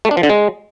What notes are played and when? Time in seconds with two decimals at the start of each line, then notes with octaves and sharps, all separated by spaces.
0.05 A3
0.11 D4
0.17 F3
0.23 D3
0.29 G#3